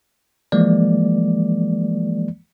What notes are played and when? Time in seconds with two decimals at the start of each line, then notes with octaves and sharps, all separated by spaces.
0.52 E3 F3 G#3 A#3 D5